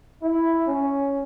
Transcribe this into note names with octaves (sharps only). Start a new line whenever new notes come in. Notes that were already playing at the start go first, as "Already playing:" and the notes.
E4
C#4